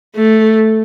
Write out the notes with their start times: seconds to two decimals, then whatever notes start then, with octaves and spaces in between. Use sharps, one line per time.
0.15 A3